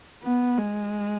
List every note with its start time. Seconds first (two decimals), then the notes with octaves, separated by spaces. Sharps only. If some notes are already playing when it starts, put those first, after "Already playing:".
0.23 B3
0.58 G#3